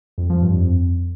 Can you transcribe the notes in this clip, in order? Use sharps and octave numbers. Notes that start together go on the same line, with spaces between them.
F2
F3
G2
F2